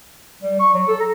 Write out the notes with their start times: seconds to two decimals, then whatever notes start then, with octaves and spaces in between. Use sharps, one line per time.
0.42 G3
0.60 C#6
0.74 F#3
0.88 A4
1.00 A#5